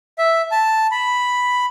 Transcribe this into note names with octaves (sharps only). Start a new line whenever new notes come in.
E5
A5
B5